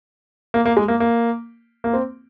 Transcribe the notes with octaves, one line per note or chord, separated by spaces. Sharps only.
A#3
A#3
G#3
A#3
A#3
A#3
C4